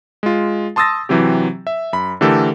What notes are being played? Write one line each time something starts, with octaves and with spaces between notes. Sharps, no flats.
G#3 F4
A5 C6 D#6 E6 A6 A#6
C3 E3 F#3 C4 G4
E5
F#2 B5
D3 E3 A3 G4 A4 A#4